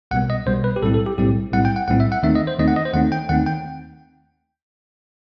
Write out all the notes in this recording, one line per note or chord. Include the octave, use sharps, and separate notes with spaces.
C2 B2 G3 B3 F#5
D#5
C2 B2 G3 B3 C5
B4
G4
B1 A2 G3 C4 E4 A4
A4
G4
B1 A2 G3 C4 E4 G4
B1 A2 G3 C4 E4 F#5
G5
F#5
B1 A2 G3 C4 E4 F#5
E5
F#5
D#2 D#3 A3 C4 D#4 E5
D#5
C5
D#2 D#3 A3 C4 D#4 D#5
F#5
D#5
C5
D#2 D#3 A3 C4 D#4 F#5
G5
D#2 D#3 A3 C4 D#4 F#5
G5